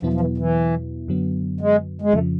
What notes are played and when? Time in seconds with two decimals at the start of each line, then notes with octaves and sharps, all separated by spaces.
0.02 E2 B2 F3 F#3 B3 E4
0.13 F3
0.20 E3
0.38 E3
1.08 F#2 D3 F#3 B3
1.61 G#3
2.02 G#3
2.14 F2 C#3 F3 A3